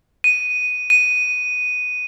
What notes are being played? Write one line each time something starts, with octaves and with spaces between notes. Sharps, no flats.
D#7
D#7